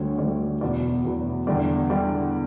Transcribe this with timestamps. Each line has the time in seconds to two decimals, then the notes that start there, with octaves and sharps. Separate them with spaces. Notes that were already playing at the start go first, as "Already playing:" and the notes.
Already playing: D2 D3 G3 C#5
0.18 D2 D3 G3 D5
0.61 E2 B2 F#3 B3 D5
1.04 E2 B2 F#3 B3
1.47 E2 D3 G3 D5
1.90 D3 G3 D5